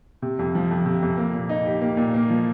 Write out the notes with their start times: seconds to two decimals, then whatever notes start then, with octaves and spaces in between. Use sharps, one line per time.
0.22 C3
0.39 F2
0.55 F3
0.71 F2
0.86 C3
1.03 F2
1.18 A#3
1.34 A#2
1.49 D#4
1.66 G4
1.81 A#3
1.97 A#2
2.14 A#3
2.30 F3